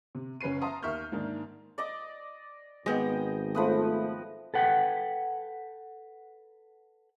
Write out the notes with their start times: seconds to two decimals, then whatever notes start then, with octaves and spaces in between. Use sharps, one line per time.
0.15 C3
0.41 F#1 C#4 B4 C7 D#7
0.62 E5 F5 A5 A#5 C6 D#6
0.82 D#2 A#4 E5 C#6 F6 G6
1.12 G#2 D#3 A#3 D4
1.78 D5 D#5 D6
2.86 G#1 G#3 B3 D#5 G5
3.55 F3 A3 B4 D#6
4.54 A4 B4 F#5 G5